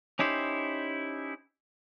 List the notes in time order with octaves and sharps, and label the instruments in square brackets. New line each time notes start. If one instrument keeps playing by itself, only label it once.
[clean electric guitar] C#4 D#4 E4 G4 C5